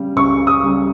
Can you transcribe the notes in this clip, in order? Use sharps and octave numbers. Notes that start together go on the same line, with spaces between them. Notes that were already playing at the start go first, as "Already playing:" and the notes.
Already playing: C#3 G3
C#2 C#6
D#6
C#3 G3